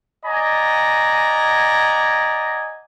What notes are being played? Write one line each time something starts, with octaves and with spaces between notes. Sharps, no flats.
D5 D#5 F#5 G#5 A#5